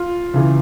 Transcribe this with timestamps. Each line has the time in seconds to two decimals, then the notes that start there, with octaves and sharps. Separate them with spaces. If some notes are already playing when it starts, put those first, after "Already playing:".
Already playing: F4
0.34 C#2 C#3 E3